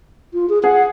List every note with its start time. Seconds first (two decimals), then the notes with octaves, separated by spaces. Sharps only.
0.34 F4
0.49 G#4
0.64 G#4 F#5